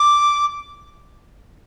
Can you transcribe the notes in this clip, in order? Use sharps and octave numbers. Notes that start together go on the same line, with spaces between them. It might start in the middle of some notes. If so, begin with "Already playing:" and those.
Already playing: D6